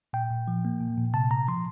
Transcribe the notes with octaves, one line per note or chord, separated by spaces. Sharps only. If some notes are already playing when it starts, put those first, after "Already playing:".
A#2 G5
A#2
F3
A#3
A#2
A#2
C3 A5
C3 A#5
F3 C6